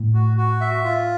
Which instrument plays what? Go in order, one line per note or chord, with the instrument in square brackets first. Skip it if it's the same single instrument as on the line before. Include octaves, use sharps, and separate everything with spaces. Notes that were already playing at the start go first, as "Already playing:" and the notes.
Already playing: [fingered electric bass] A2
[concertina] F#4
F#4
E5
F4